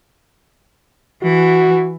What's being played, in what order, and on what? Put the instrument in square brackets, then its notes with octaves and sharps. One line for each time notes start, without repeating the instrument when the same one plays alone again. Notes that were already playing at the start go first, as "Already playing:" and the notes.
[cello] E3 [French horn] F#4